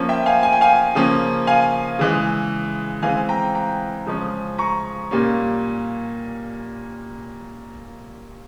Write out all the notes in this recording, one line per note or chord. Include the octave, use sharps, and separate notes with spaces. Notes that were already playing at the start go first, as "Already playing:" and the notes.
Already playing: F3 A#3 C#4
E5 G5
F5 G#5
G#5
G5
F5 G#5
C#3 F3 A#3 C#4
F5 G#5
C#3 E3 G#3
E3 G#3 C4 F5 G#5
G5 A#5
G5 A#5
C#3 F3 G#3 C#4
A#5 C#6
A#2 G3 A#3 C#4